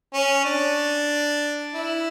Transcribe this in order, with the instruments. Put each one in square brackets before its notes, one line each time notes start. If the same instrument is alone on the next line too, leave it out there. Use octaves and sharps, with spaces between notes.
[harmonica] C#4
D4
E4